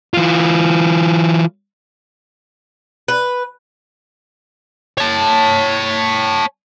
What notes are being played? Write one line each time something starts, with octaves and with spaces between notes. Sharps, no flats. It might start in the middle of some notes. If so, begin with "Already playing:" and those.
E3 F4
B4
C#5 A5